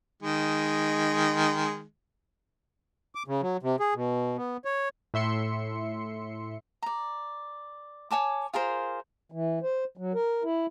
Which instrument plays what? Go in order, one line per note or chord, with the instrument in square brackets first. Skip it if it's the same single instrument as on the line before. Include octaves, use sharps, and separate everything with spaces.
[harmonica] D#3 G#3
[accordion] D6
C#3
F#3
C3
G#4
B2
B3
C#5
[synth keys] A2 E5 C6 C#7
[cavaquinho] D5 A#5
C#5 G#5 A5 D6
F4 G#4 A#4 C5
[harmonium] E3
C5
F#3
A#4
E4